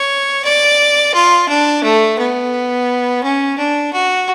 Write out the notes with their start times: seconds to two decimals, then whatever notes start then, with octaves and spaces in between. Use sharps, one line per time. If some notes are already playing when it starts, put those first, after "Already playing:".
Already playing: C#5
0.45 D5
1.14 F4
1.49 D4
1.83 A3
2.18 B3
3.23 C#4
3.58 D4
3.93 F#4